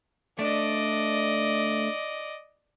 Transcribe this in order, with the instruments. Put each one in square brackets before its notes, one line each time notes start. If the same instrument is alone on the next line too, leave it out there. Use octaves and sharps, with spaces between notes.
[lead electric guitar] A3 D4 [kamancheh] D5 D#5